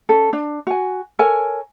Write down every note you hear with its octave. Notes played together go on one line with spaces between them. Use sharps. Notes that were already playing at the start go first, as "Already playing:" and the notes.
C#4 A4
D4
F#4 G#5
A4 A#4 C#5 G#5